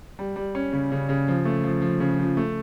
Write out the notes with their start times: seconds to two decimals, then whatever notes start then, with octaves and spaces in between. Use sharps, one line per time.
0.19 G3
0.36 G3
0.55 C#4
0.73 C#3
0.92 C#3
1.09 C#3
1.28 F3
1.45 A3
1.64 F3
1.82 F3
2.00 C#3
2.19 F3
2.37 A3